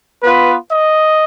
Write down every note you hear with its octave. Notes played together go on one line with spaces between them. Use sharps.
B3 F4 B4
D#5